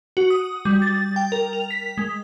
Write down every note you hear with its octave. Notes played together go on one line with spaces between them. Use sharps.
F#4
D#6
G3
A6
G5
A#4
F7
B6
G#3